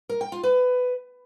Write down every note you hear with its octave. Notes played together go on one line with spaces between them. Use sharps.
A#4
G5
F4
B4